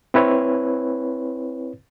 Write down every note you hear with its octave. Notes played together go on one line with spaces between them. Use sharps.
C4 E4 B4 C#5